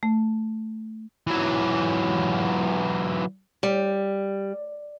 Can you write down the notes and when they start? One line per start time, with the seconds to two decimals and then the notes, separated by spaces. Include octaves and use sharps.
0.03 A3
1.27 E3 F#3
3.63 G3